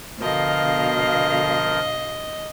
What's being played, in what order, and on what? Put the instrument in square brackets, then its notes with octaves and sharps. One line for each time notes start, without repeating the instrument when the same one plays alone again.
[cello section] B2 D3 F5 [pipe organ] F3 A#4 [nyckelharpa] D#5